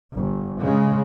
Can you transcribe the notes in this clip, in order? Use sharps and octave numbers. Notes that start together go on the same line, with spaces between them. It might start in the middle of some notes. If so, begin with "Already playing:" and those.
G1
C#3 G#3